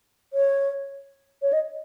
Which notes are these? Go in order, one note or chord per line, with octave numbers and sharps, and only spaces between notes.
C#5
C#5
D#5